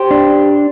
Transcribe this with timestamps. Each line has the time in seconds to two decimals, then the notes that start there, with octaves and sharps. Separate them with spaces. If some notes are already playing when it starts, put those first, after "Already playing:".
Already playing: G4 C5
0.11 D4